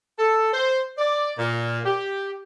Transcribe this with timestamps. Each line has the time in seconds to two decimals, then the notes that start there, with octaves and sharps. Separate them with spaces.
0.18 A4
0.53 C5
0.98 D5
1.37 A#2
1.85 G4